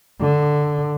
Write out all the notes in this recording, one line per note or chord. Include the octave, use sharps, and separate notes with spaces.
D3